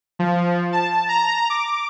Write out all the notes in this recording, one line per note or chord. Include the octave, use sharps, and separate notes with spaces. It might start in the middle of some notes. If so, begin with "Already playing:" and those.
F3
A5
A#5
D6